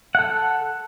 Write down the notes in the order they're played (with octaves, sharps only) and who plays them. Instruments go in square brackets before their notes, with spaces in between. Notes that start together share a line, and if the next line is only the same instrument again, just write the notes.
[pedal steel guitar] A4 F#5